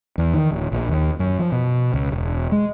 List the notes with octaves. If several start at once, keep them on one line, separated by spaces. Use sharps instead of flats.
E2
D#3
D1
A#1
D#2
F#2
F3
B2
C#2
E1
G#3